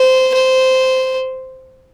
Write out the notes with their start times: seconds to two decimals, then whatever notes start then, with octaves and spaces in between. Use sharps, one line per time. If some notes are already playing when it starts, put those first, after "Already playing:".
Already playing: C5
0.34 C5